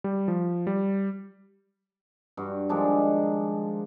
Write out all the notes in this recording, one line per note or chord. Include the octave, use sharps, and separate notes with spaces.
G3
F3
G3
G2 F#4
D#3 F3 G#3 D4